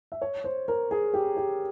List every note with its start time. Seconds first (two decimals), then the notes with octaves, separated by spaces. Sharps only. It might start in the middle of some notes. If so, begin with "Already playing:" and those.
0.12 E5
0.22 C#5
0.44 C5
0.68 A#4
0.91 G#4
1.14 G4
1.37 G4